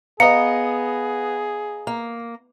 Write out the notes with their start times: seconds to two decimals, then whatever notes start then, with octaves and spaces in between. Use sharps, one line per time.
0.20 B3 G#4 D#5 F5 A#5 C#7
1.87 A#3